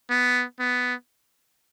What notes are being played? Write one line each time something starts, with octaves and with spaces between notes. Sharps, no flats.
B3
B3